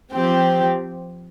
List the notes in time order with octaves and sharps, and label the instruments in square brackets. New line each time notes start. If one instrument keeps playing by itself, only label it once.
[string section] F3 C4 G4